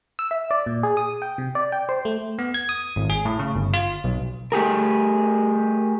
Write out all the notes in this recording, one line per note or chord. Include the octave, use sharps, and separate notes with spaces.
E6
E5
D5
A#2
G#4
D#6
G5
C3
D5
G5
C5
A3
B3
G#6
D#6
G#1
G#4
A2
C#3
G1
F4
B1
A3 G4 G#4 A#4